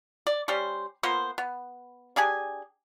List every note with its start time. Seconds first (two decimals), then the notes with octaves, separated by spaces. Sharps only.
0.27 D5
0.48 G3 C#4 G4 C5
1.03 A#3 B3 F4 C5
1.38 B3
2.16 D4 G4 G#4 G#5